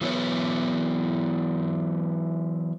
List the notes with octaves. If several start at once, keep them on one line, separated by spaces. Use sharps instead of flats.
E3 F#3 B3 E4 C#5